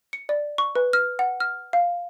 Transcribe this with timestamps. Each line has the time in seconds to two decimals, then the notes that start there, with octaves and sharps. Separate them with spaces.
0.13 C#7
0.29 D5
0.58 C#6
0.76 B4
0.93 F6
1.19 F#5
1.40 F6
1.73 F5